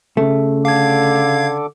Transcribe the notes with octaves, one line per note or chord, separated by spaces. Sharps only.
C#3 A3
D3 A4 F5 D6 G#6